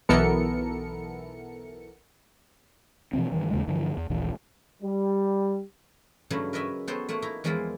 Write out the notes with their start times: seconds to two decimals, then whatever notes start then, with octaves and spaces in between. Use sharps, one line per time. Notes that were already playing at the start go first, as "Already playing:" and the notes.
0.09 B1 E3 B3 A4 A#4 C#7
3.13 B2 E3 F3 C4
3.32 G2 D#3 E3
3.51 D#2 C#3 G#3
3.68 G2 D3 E3 F3
3.97 E2
4.10 D#1 A#1 E3
4.83 G3
6.30 G2 C#3 F#3 A3 E4
6.53 A#4 B4 C#5 D#5 E5 G#5
6.88 B3 F#4 A4 C5 C#5 G5
7.09 A3 A#3 C#5 F#5
7.22 D#4 E4 A#5
7.44 E2 F3 G#3 A#3 E4 F4